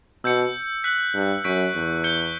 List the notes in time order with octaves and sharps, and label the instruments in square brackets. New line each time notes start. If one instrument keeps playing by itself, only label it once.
[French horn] B2 [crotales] E6 G6 C#7
[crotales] F#6 B6 F#7
[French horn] G2
[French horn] F#2 [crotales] C#6 G6 B6 D7
[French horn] E2
[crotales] G6 C#7 G7